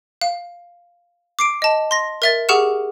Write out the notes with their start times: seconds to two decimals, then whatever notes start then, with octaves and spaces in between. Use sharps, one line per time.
0.21 F5
1.39 D6 C7 D7
1.62 D#5 A5
1.91 C6 A#6
2.22 A#4 E5 A6
2.49 G4 G#4 F#5 C#6 F6 E7